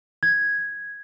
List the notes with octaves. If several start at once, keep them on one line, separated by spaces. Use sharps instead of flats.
G#6